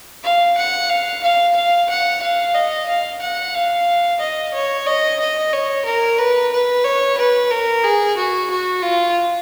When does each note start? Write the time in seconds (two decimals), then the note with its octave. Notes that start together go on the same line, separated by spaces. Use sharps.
0.24 F5
0.57 F#5
0.90 F5
1.23 F5
1.56 F5
1.90 F#5
2.23 F5
2.55 D#5
2.89 F5
3.21 F#5
3.55 F5
4.20 D#5
4.54 C#5
4.87 D#5
5.20 D#5
5.52 C#5
5.86 A#4
6.18 B4
6.52 B4
6.84 C#5
7.18 B4
7.51 A#4
7.84 G#4
8.17 F#4
8.50 F#4
8.82 F4